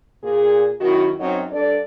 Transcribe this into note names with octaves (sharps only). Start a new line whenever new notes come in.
A#2 G#4
F#2 D#3 E4 F#4
F#2 F#3 C4 D#4
G2 D4 A4 D5